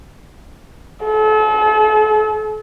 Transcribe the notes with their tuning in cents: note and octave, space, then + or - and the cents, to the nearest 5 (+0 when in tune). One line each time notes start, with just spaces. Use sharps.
A4 -40